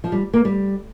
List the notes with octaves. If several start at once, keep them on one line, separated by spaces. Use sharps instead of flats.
F3
G3
A#3
G3